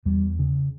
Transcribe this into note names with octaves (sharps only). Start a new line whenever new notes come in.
E2 G3
C#3